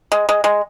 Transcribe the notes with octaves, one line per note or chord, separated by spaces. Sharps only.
G#3
G#3
G#3